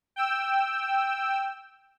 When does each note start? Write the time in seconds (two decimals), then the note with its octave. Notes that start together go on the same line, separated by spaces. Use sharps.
0.16 G5 E6